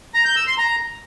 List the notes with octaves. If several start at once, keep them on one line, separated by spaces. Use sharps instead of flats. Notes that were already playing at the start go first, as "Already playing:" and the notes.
A#5
G6
E6
C6
A#5